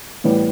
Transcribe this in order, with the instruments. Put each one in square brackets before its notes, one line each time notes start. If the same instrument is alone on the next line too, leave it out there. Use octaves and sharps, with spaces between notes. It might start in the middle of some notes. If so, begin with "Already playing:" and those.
[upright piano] A2 E3 G3 B3